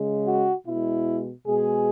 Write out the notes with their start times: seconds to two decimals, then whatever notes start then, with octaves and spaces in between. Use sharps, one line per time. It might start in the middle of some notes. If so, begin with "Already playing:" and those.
Already playing: C#3 G#3
0.27 F#4
0.66 B2 G#3 E4
1.46 B2 G#3 G#4